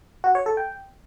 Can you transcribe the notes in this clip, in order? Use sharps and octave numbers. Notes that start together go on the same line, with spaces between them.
F#4
C#5
A4
G5